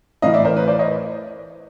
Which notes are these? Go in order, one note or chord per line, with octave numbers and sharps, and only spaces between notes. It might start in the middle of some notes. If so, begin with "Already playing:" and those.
A2 E3 D#5 F5
D5 E5
A#4 C5
B4 C#5
C5 D5
C#5 D#5